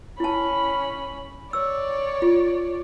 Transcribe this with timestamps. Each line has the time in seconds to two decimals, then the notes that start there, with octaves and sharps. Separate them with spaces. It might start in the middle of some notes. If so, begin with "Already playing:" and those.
0.20 C#4 E4 A5 B5
1.53 C#5 D5 E6
2.22 F4